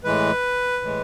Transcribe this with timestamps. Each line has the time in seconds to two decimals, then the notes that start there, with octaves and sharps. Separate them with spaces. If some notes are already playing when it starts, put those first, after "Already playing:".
0.04 A2 E3 G#3 B4
0.81 A2 E3 G#3